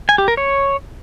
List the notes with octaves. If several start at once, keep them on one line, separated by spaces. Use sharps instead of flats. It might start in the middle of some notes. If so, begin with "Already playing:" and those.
G#5
G4
A#4
C#5